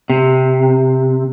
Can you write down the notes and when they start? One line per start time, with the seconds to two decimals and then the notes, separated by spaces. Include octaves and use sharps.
0.10 C3